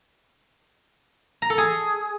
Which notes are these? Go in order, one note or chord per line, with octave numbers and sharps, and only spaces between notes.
A#5
A4
G#4